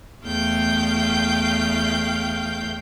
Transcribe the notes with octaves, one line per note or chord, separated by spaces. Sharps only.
E2 A3 F5 G5 G6